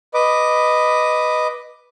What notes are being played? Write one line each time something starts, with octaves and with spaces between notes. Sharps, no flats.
B4 D#5 D6